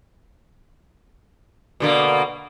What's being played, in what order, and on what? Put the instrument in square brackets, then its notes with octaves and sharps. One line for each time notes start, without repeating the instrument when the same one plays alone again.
[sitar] B2 D3 A#3